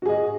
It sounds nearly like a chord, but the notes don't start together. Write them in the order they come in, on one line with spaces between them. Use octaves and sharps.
F#4 G#4 D#5